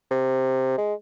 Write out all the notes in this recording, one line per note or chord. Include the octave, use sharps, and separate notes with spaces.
C3
G#3